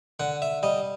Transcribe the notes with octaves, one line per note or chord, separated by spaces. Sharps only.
D3 F#5
E5
G3 D#5